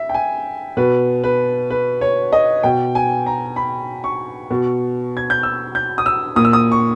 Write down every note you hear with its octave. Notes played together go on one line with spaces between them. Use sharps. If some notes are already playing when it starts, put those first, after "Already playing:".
Already playing: E5
G5
G#5
B2 B4
B4
B4
C#5
D#5
B2 G5
G#5
A#5
B5
C#6
B2
G#6
G6
E6
G6
D#6
E6
A#2 D#6
E6
D#6
C#6